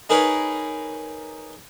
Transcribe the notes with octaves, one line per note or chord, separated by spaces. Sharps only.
D#4 G#4 A#4 B4 C#5